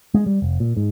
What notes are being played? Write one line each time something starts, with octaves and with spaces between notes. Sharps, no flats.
G#3
G3
F1
A#2
G#2